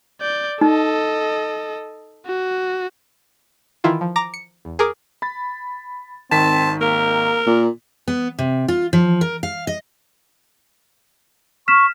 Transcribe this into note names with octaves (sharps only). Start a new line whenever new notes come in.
D5 G6
D#4 A4 D#5
F#4
D#3 E3 E4 F4
F3
A#5 D6 A#6
C#7
E2
G#4 A#4 D6
B5 A6
G#1 D#3 C4 A5 B6
A#3 A#4
A#2
B3
C3
F4
F3
A#4
F5
D#5
C#6 F6 B6 E7